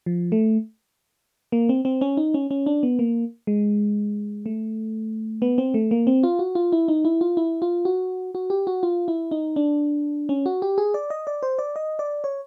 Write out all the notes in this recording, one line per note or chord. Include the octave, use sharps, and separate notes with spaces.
F3
A3
A#3
C4
C4
C#4
D#4
C#4
C#4
D4
B3
A#3
G#3
A3
B3
C4
A3
A#3
C4
F4
F#4
F4
E4
D#4
E4
F4
E4
F4
F#4
F#4
G4
F#4
F4
E4
D#4
D4
C#4
F#4
G4
G#4
D5
D#5
D5
C5
D5
D#5
D5
C#5